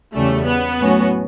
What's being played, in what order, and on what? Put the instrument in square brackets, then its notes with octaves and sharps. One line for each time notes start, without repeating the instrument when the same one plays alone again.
[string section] E2 C#3 G3 C#4 [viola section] A3
[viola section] B3
[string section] A2 F#3 C#4 F#4